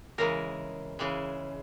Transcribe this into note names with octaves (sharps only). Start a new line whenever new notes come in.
C#3 E3 G#3 A#4
C#3 E3 G#3